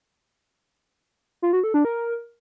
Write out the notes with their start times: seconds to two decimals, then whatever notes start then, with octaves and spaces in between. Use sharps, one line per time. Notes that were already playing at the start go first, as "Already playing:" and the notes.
1.42 F4
1.53 F#4
1.64 A4
1.74 D4
1.85 A#4